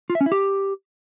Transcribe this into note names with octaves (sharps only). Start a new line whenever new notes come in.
F4
E5
C#4
E4
G4